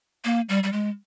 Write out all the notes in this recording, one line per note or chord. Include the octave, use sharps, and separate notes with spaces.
A#3
G3
G3
G#3